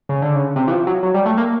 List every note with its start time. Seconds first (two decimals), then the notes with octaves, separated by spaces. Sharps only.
0.09 C#3
0.22 D3
0.35 C#3
0.56 C3
0.68 E3
0.71 F3
0.87 F#3
1.03 F#3
1.14 G3
1.26 A3
1.37 A#3